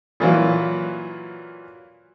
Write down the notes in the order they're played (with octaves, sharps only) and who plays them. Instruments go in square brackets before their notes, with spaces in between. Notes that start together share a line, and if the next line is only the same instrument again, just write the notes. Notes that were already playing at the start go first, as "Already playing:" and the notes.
[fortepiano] A#2 E3 F#3 F4